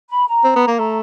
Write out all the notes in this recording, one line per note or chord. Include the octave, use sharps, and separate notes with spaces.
B5
A#5
C4
B3
A#3
A3 A#5